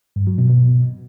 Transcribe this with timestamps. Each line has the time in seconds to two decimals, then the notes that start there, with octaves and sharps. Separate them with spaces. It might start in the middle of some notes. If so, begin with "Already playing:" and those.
0.16 G2
0.27 F#3
0.38 B2
0.49 B2